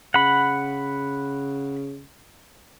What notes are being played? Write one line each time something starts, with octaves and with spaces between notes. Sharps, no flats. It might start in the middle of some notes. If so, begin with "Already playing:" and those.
C#3 F#5 B5